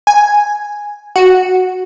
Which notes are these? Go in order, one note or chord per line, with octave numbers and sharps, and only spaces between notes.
G#5
F#4